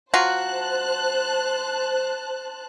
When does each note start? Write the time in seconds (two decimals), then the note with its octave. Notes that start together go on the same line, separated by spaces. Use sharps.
0.14 F#3 F4 F#4 C5 A5 F#6